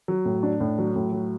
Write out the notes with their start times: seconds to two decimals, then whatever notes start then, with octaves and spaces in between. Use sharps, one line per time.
0.08 F#3
0.25 A2
0.43 D4
0.60 A2
0.79 F#3
0.95 A2
1.13 F#3